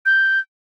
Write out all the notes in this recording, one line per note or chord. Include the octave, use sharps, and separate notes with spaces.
G6